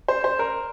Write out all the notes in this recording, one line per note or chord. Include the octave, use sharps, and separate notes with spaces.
C5
C5
A#4